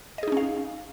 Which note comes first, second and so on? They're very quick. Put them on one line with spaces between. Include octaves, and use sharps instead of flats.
D#5 G#4 D#4 C#4 F5